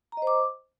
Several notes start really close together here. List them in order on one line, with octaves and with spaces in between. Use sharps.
A#5 D#5 C5 D6